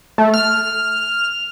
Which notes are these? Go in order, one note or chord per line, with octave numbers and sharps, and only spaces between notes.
A3
F6